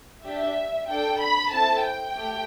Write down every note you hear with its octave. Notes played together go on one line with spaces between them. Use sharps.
D4 G4 E5
D4 A4 G5
B5
C4 E4 A4 A5
G5
A3 G4